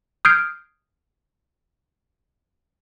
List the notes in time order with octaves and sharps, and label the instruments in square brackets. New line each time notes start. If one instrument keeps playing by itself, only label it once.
[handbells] D#6 F6 G6 G#6 C7 D7